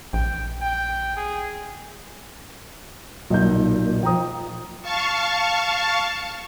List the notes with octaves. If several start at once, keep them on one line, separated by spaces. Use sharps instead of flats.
A#1 G5
G5
G#4
B1 A#2 D#4 G6
F3 G5 A#5 D#6
F5 A5 C#6